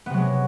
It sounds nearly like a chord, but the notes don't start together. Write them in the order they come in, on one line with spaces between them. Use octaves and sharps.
B3 C3 F#3 G#3